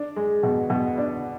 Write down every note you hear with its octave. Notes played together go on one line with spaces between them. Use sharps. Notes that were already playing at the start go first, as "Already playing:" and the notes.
Already playing: D4
G#3
B2
B2
D4